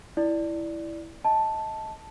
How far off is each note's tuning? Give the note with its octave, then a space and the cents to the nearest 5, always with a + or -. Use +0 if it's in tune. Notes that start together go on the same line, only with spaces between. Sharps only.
E4 +0 D5 +0
D#5 +25 A5 +0